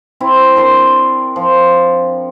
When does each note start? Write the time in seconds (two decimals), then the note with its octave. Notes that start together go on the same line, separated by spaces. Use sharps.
0.20 C4 E4
0.56 D4 A#4 C6
1.36 F3